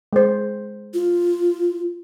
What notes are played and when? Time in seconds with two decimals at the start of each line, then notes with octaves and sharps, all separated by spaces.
0.13 G#3 C5
0.94 F4